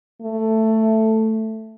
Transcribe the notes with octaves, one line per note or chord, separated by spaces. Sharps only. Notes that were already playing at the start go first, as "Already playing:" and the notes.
A3